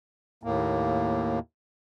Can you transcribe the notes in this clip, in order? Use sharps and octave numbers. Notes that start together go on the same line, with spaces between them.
D#2 A2 A#3